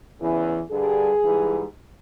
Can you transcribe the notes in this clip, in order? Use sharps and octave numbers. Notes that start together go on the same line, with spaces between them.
E2 C#3 E3
G2 D3 G3 G#4
G#2 E3 G3